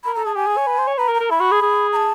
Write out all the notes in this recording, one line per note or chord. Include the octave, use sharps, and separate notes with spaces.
A#4 B5
A4 A#5
G#4 A5
G4 G#5
G#4
C#5
B4
C5
C#5
B4 A#5
A#4
A#5
A#4
E4 B5
F#4
G#4
G#4
A#5
A5